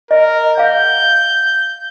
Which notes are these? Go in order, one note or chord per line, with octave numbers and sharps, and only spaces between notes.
A#4 D#5
F5 F#5 G6